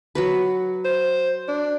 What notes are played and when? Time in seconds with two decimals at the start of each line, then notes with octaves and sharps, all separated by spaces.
0.15 F#3 F#4 B4
0.84 C5
1.48 D4